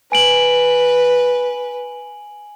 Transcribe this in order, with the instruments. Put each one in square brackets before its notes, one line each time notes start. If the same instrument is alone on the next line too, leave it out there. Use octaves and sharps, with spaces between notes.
[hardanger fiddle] B4 [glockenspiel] G#5 D7 F#7